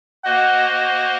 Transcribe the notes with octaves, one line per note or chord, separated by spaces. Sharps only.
A#3 F#4 C5 D#5 F#5
F#5